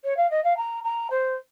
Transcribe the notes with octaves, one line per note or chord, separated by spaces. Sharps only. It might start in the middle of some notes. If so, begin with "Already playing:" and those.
C#5
F5
D#5
F5
A#5
A#5
C5